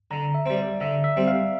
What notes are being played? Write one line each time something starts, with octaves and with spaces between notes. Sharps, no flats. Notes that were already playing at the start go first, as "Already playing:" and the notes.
D3 A#5
E5
G3 C4
D5
D3 E5
E5
G3 C4
F5